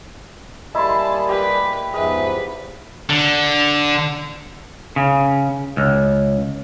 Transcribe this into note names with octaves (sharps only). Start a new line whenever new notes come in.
G3 A#3 E4 G#4 D#5 A5 B5 C6
G4 B4
E2 G#2 F3 G#4 B4 D#5 E5
D3
C#3
C#2